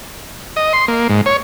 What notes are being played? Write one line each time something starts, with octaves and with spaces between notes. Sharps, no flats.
D#5
C6
A#3
G#2
C#5